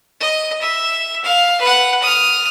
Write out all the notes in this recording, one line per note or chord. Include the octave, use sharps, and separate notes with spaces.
D#5
E5
F5
B4 F#5
D#6 F6